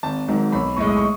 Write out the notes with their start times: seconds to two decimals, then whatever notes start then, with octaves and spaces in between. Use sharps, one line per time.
0.03 G#1 A5
0.28 G#2 D#3 F#3
0.52 B1 B5
0.77 A2 G#3 C#6
0.87 D#6
0.97 C#6